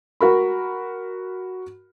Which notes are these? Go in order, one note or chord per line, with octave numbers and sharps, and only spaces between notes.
F#4 A#4 B5